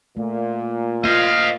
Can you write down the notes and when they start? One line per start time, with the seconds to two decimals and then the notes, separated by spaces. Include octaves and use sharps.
0.17 A#2 A3
1.04 A#3 F4 C5 D#5 F5 F6